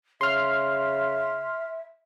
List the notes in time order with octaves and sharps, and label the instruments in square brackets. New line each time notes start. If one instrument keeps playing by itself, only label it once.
[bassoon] C#3 [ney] E5 [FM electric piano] C6 F6